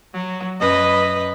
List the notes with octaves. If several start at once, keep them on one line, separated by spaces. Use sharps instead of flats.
F#3
F#2 B4 D#5